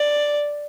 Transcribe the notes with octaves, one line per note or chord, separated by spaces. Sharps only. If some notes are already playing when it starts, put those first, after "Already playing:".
Already playing: D5